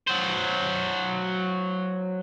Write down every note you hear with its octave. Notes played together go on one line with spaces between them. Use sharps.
F#3 C5